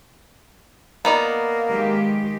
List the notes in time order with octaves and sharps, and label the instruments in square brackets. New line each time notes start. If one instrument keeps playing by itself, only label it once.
[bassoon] A#3 [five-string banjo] B3 D#4 D5
[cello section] D#3 G#3 G4